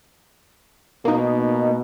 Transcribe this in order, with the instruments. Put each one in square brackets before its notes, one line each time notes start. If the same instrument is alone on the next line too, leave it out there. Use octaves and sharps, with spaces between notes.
[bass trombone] B2 [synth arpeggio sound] A#3 D#4